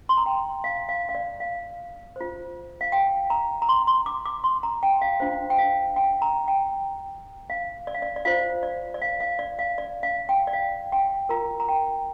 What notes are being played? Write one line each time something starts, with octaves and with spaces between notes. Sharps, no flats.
C6
A#5
G5
F5
F5
F5
D5
F5
F4 C5
F5
G5
A#5
A#5
C6
C6
D6
D6
C6
A#5
G5
F5
D4 F4 C5 F5
G5
F5
G5
A#5
G5
F5
D5
F5
D5
D5
F4 C5 F5
D5
D5
F5
F5
D5
F5
D5
F5
G5
D5
F5
G5
F4 A#4 A#5
A#5
G5